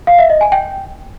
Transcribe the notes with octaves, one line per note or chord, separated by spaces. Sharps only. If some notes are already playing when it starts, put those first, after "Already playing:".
F5
E5
D#5
G#5
G5